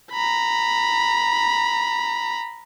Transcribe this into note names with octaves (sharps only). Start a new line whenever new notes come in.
A#5 B5